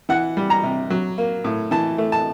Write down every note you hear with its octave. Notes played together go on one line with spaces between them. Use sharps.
E3 F#5
G3
A#5
C3
F#3
A#3
A2
E3 A5
A3
A5